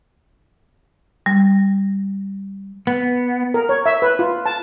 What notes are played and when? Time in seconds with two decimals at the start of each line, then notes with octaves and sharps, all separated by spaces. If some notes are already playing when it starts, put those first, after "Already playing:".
1.26 G3
2.87 B3
3.54 A#4
3.69 C#5
3.86 E5
4.02 B4
4.19 F4
4.46 A5